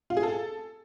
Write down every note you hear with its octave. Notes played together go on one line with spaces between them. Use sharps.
F4
G#4
A4